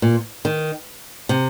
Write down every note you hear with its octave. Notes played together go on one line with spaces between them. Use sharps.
A#2
D#3
C3